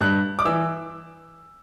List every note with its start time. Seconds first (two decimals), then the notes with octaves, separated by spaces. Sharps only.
0.01 G2 F#6
0.39 D6
0.45 E3 E6